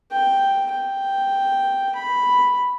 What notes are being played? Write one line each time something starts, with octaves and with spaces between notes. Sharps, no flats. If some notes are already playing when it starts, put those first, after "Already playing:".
G5
G5
B5